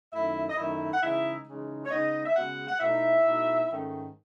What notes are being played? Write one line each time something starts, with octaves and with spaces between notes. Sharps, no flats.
F#2 D#3 A3 D#4 E4 E5
D#5
F#2 D#3 A3 D#4 E4 E5
F#5
C#3 E3 G#3 D#4 E4 E5
C#3 E3 G#3 D#4
C#5
C#3 G#3 B3 D#4 D#5
E5
C#3 G#3 B3 F#4 F#5
F#5
B2 A3 D#4 E4 E5
B2 A3 D#4
G#2 D#3 A3 C#4